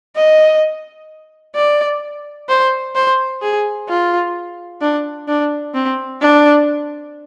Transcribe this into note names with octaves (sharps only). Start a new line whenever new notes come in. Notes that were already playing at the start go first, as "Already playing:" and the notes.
D#5
D5
C5
C5
G#4
F4
D4
D4
C4
D4